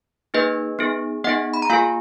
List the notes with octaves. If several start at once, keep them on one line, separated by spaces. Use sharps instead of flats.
A#3 D#4 G#4 B4 D#5
B3 D#4 G#4
B3 D#4 G#4 D#5 F#5
B5
A#5
A#3 F4 G#4 F5 G#5